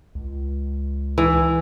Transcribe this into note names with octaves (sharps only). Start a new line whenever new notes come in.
C#2
E3